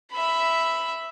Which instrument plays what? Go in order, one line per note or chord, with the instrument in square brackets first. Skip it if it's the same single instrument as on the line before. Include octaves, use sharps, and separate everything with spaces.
[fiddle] E5 B5